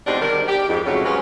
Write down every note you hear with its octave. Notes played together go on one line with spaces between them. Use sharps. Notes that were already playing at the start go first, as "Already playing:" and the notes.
B2 G3 G#3 C4 D4 D#4
D3 D#3 G3 D4 A#4
G4
F2 G#2
F2 G#2 C#3 F#3 A3 C#4
F#3 G#3 B3 C#4 F4